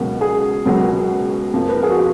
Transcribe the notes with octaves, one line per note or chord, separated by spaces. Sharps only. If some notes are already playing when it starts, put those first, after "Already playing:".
Already playing: C#2 B2 F#3 A#3
G#4
C#2 B2 F#3 A#3
F2 F3 A#3
B4
A#4
G#4
F#4
F4